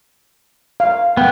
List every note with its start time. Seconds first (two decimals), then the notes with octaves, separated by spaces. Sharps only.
0.80 F5
1.17 B3 G5